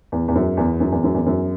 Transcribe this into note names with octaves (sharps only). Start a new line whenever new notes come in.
E2
E2
F#2
E2
F#2
E2
F#2
E2
F#2